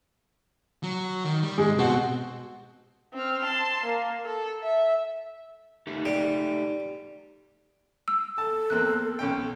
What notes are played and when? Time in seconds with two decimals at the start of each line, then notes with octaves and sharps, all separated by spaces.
0.83 F#3
1.24 D#3
1.43 G3
1.58 G#2 C3 G#3
1.79 B2 C4 F#5
3.14 C4 F6
3.42 A5 C6
3.84 A#3
4.26 A4
4.63 E5
5.87 A3 D#4 G4
6.06 G3
8.08 E6
8.38 A4 A5
8.70 E2 A#3 C4 F#6
9.19 B1 C#4 G5